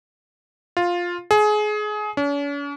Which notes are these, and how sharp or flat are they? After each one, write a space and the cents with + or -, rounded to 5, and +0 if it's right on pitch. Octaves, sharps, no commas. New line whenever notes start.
F4 +5
G#4 +25
C#4 +45